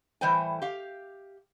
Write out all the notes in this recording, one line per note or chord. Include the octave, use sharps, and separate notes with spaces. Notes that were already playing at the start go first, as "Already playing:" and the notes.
A2 E3 G3 C5 G5 G#5
G4 F5